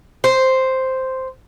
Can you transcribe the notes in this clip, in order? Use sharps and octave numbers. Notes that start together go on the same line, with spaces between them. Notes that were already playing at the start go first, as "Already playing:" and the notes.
C5